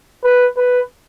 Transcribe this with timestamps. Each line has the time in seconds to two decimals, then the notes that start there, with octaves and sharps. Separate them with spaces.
0.24 B4
0.57 B4